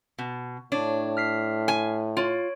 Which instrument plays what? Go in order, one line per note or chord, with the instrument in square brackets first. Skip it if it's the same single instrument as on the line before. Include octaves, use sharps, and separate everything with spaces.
[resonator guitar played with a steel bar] B2
[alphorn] A2 [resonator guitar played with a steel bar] D4 [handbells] C#5
[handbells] F6 B6 C7
[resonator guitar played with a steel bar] G#5
[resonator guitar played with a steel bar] F4 [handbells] C#5 D7